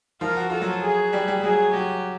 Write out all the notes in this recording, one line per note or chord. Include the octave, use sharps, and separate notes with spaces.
F3 F4 A#4
F#4
F4 A4
F#3 F#4
G#4
G3 G4
G3 G4
F#3 F#4 G#4
F#3 F#4 G4